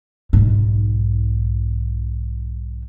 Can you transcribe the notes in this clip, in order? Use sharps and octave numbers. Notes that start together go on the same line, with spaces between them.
B1 G#2